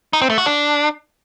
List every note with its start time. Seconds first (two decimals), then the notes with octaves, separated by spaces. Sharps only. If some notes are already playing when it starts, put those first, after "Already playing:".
0.13 D#4
0.22 C4
0.30 A3
0.38 F#4
0.46 D4